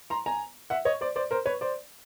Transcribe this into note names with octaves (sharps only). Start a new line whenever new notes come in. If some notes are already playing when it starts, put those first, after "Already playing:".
A#5 C6
G#5 A#5
E5 F#5
C#5 D#5
C5 D5
C5 D5
A#4 C5
B4 C#5
C5 D5